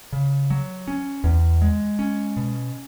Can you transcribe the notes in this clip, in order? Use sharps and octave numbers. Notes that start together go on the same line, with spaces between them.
C#3
F#3
C#4
E2
G#3
C#4
B2